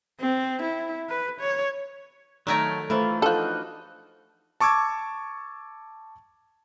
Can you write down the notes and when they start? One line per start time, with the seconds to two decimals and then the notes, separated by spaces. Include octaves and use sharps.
0.20 C4
0.62 E4
1.09 B4
1.40 C#5
2.47 D#3 F#3 A3 A#4 C#5 A5
2.90 E3 A3 F4 C5
3.22 F3 D4 D#4 F#4 A4 F#5 F6 F#6
4.60 A5 C#6 D6 E6 G#6